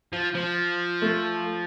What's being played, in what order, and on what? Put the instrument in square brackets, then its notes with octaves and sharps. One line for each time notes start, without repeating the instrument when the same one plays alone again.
[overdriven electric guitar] F3
F3
[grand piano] A3